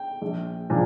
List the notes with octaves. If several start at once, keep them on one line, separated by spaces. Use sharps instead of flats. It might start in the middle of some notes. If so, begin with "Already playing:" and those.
Already playing: G5
A#1
A#2 F3 G#3 D4